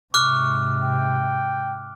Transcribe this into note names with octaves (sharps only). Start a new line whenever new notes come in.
G#2 C3 C#6 D6 F6 F#6
G5